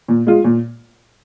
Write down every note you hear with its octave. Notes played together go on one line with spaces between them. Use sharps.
A#2
G#3 F4
A#2